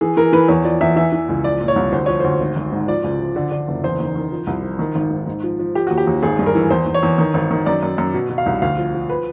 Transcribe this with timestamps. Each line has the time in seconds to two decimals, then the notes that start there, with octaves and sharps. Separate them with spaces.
0.01 E3 G#4
0.17 E3 A#4
0.32 E3 B4
0.48 E2 C#5
0.64 F3 D5
0.81 E2 E5
0.96 E3 E5
1.12 E3
1.29 C#2
1.44 F3 D5
1.61 A#2
1.68 C#5
1.76 C2
1.92 D2 C5
2.06 F3 C#5
2.20 D2 C5
2.40 G#1
2.56 G#1
2.72 G#2
2.88 F3 D5
3.04 C#2
3.20 F3
3.36 D3
3.52 D3
3.68 F#1
3.84 E2 C5
4.00 D#3
4.16 D#3
4.32 F3
4.47 C2
4.63 F3
4.79 D#3
4.95 G#1
5.11 G#2
5.27 G#2
5.44 F3
5.59 F3
5.75 F3 G4
5.87 D#2 F#4
5.98 G4
6.07 D#2
6.22 G#1 G#4
6.39 G2
6.46 A#4
6.55 E3
6.70 E2 C5
6.87 E2
6.94 C#5
7.03 E2
7.18 D#3
7.34 G#1
7.51 D#3
7.66 F#2 D5
7.83 F#2
7.98 F#2
8.14 B2
8.30 B2
8.38 F5
8.46 C2
8.62 D2 F5
8.78 F3
8.94 F3
9.10 B4